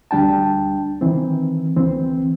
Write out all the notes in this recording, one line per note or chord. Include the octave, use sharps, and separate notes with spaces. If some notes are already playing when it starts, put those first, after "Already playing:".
D2 G3 D4 G5 A5
D#3 E3 C4
D2 E3 C4